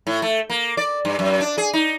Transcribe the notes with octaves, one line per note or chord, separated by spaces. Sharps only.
A2
A3
A#3
D5
G2
F#2
D4
G#4
D#4